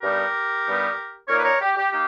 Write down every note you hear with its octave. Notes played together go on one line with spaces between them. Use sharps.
G2 G3 B3 D#4 G4 A#4
G2 G3 B3 D#4
A#2 A#3 D#4 A#4 C#5
B4
A#4 C#5
G4
G4
A#3 D#4 G4